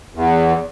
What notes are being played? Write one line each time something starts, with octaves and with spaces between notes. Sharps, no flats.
E2